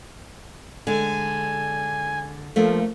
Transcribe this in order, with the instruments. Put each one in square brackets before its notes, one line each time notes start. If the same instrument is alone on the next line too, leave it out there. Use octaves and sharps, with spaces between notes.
[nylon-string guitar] D3 G#3 [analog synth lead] G#5
[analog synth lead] F3 [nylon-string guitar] A3 A#3 D4